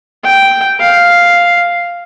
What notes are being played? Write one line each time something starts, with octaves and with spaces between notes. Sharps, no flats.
G5
F5